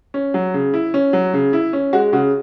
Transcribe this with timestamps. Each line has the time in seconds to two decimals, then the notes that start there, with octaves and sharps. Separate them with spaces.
0.14 C#4
0.34 F#3
0.54 C#3
0.74 E4
0.94 C#4
1.13 F#3
1.34 C#3
1.53 E4
1.73 C#4
1.93 G#3 F#4
2.13 C#3 F#4